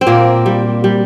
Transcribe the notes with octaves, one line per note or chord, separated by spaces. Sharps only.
C4
A#2 A#3
G3
G3